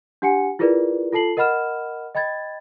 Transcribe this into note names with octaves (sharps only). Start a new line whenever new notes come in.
D4 G4 F#5 G#5 C#7
E4 F4 G#4 A#4 B4 D5
F4 A4 A5 C7 F#7
A#4 D#5 F#5 B5 F6 E7
D#5 G5 B5 G#6 A6